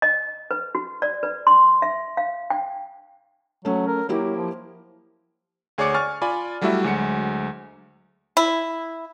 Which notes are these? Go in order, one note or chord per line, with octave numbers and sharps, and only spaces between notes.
D#5
B4
F#4
D5
B4
C6
E5
F5
G5
F#3 A3 C#4
A#4
F#3 A#3 E4 G4
F3
D2 G#4 C#5 D5 D6 C#7
G#5 C#6 F6 A6
F4 D5 G#5 B5
F#3 G3 A3 E4 F#4 E5
D2 F#3 G#3 C#7
E4